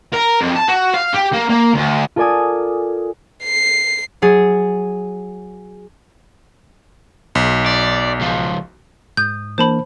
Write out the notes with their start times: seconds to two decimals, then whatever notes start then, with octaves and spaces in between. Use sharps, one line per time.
0.14 A#4
0.41 F2
0.56 A5
0.68 F#4
0.94 F5
1.14 G4
1.33 A#3
1.49 A#3
1.74 D2
2.16 F4 A4 A#4 D5 G#5 D#6
3.44 C7
4.22 F#3 G#4 A6
7.35 B1
7.66 D5
8.20 C#2 F3
9.17 G#2 D#6 G6
9.58 E3 A#3 D4 C5 A5 B5